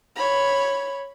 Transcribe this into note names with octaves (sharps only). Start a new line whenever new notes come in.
C#5 B5